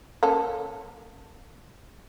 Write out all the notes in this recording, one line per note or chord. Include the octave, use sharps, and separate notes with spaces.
A#3 C#4 A4